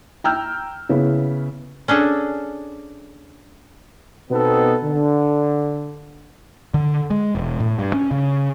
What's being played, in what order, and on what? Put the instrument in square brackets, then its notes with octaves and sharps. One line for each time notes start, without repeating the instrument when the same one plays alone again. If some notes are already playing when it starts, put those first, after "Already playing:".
[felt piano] G5 A#5 E6 F6 G6
C#3 B3 E4
[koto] C#4 D4 G#4 A4
[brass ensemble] B2 B3 C4 D#4 A4
D3
[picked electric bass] D3
G#3
E1
A2
G2
C#4
C#3